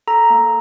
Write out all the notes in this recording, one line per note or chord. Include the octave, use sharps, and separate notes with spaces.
A4 A#5
A#3